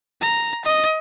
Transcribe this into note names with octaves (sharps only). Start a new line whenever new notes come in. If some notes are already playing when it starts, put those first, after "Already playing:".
A#5
D#5